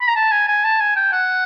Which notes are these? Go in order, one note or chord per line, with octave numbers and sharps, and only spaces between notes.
B5
A#5
A5
G#5
G#5
A5
G#5
G5
F#5